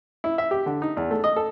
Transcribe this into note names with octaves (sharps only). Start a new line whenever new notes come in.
E4
E5
G4
D3
D#4
E2
A3
D#5
A4